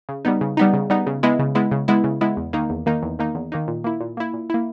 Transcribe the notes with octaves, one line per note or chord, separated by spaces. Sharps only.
C#3
G3 B3 D#4
C#3
G3 B3 D#4
C#3
G3 B3 D#4
C#3
G#3 B3 E4
C#3
G#3 B3 E4
C#3
G#3 B3 E4
C#3
G#3 B3 E4
E2
D#3 A#3 D#4
E2
D#3 A#3 D#4
E2
D#3 A#3 D#4
E2
D#3 A#3 D#4
A#2
A#3 E4
A#2
A#3 E4
A#2
A#3 E4